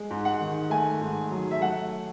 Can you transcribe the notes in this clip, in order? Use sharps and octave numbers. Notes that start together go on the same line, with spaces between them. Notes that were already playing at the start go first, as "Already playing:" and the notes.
Already playing: G#3
G#2
F#5
D#3
A3 G#5
G#2
F#3
E5
A3 F#5